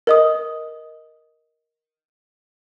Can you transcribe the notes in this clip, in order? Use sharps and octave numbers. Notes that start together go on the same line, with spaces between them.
A#4 D#5 D#6